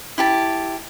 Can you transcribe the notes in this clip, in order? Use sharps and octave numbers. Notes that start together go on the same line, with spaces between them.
E4 G4 A5